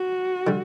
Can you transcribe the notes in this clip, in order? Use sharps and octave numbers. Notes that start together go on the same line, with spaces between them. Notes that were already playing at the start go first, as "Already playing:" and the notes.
Already playing: F#4
D3 G3